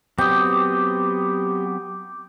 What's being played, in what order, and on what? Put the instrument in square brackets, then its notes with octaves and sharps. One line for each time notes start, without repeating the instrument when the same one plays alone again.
[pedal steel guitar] F#3 B3 C4 [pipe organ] G4 [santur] G5 D#6 [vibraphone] D6